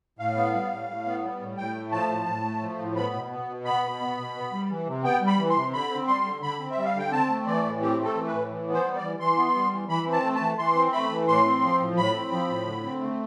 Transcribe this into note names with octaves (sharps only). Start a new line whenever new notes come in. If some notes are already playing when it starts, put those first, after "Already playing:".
A2 F5
B3
G3
A2
A2
B3
G3
A2
A2 G5
A3
F3 A5
A2
A2
A3
F3
A2
B3 B5
B2
B3
B2
B3 B5
B2
B3
B2
B3
G3
E3
C3
B3 G5
G3
B5
E3
C6
C3
D3 B5
C4
G3 C6
D3
D3 B5
C4
E5
G3
F5
D3 G5
C4 A5
A3
E3 D5
A2
C4 G4
A3
A4
E3
B4
A2
E3
B3
C5
G3
D5
E3
E3 C6
B3
G3
E3
E3 B5
C4
A5
A3
A5
E3
E3 C6
C4
A3 B5
E3
A2 C6
C4
F3
A2
A2 B5
C4
F3
A2
D3
C4
A3